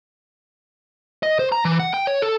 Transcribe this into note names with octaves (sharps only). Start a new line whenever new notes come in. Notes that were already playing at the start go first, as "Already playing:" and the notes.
D#5
C5
A#5
E3
F#5
G5
C#5
A4